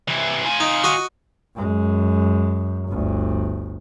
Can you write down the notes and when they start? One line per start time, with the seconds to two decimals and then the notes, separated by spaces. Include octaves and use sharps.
0.08 C3 E3
0.45 F4 G#5
0.60 D#4
0.84 F#4 D#5 D#6
1.55 F#2 G#3
2.89 G1 D2